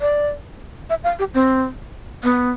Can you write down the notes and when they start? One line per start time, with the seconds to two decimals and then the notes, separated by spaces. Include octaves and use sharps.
0.01 D5
0.90 E5
1.04 F5
1.19 G4
1.34 C4
2.23 B3